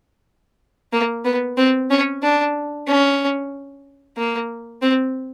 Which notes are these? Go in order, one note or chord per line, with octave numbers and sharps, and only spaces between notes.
A#3
B3
C4
C#4
D4
C#4
A#3
C4